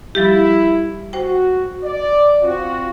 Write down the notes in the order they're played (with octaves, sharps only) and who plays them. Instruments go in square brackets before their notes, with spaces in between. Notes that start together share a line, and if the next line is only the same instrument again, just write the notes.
[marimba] F3 G3 G4 [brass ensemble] E4
[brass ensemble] F#4 [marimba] C5 G5
[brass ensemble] D5
C4 F4 F#4